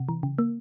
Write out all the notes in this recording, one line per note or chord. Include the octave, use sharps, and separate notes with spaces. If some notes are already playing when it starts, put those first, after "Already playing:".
Already playing: C3
E3
C#3
A#3